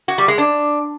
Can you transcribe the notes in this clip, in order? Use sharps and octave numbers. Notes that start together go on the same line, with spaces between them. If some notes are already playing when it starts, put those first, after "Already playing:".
F#4
G3
G#3
D4